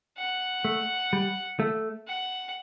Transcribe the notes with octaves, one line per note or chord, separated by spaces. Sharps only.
F#5
A3
G3
A3
F#5